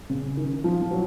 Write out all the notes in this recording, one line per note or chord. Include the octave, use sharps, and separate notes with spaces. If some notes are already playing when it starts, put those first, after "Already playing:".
C#3
D#3
F3
F3
F#3